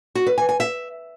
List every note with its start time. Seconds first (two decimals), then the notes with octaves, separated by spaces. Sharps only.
0.15 F#4
0.27 B4
0.38 G#5
0.49 G#5
0.60 E5